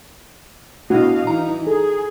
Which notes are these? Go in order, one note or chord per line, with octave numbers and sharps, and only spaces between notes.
B2 A3 D4 E4 F#4 D#5 F5
E3 D#4 A#5
G#4 A4